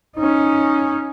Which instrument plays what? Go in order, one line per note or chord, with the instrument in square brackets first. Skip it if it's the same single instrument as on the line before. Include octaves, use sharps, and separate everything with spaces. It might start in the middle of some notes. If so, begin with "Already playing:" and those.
[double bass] C#4 D#4